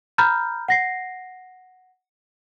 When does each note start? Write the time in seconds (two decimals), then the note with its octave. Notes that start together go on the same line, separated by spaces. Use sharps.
0.18 A#5 B5 F6 G6 A6
0.68 F#5 A#6 C7